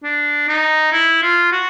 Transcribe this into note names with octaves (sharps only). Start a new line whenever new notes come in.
D4
D#4
E4
F4
F#4